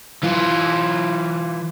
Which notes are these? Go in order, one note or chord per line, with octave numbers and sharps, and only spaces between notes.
E3 F4